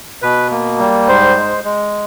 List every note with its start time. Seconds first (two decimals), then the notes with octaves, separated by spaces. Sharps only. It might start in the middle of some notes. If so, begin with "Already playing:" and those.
0.22 B2 B4
0.51 A#3
0.79 G3
1.07 G#2 C5
1.36 G#3
1.64 G#3